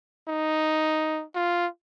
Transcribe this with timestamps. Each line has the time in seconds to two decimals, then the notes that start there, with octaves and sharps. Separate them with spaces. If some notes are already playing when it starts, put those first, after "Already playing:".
0.28 D#4
1.35 F4